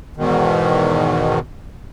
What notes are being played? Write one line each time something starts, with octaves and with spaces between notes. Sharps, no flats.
E2 G#2 B2 D#3